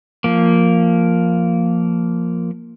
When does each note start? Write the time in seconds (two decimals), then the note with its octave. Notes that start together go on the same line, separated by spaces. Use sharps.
0.24 F3 A#3